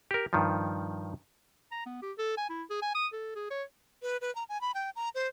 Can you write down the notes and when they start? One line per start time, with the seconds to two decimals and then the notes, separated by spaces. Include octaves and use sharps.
0.11 G4 A#4
0.33 G2 D#3 F3
1.72 A#5
1.86 B3
2.02 G4
2.18 A4
2.37 G#5
2.50 E4
2.70 G#4
2.82 G#5
2.95 D#6
3.13 A4
3.35 G#4
3.50 C#5
4.03 B4
4.21 B4
4.35 A#5
4.49 G#5
4.61 B5
4.74 G5
4.96 A#5
5.15 C5